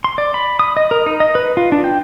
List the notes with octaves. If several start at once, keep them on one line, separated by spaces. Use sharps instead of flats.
C6
D5
B5
D#6
D#5
A#4
D#4
D#5
B4
F4
D4
G5